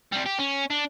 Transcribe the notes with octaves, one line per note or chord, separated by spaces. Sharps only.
C3 G3
G4
C#4
D4